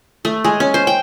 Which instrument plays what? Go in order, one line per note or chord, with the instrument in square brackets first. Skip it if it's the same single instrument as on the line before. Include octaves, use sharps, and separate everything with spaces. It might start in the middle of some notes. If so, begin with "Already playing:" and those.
[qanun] A3
G#3
C#4
C5
G5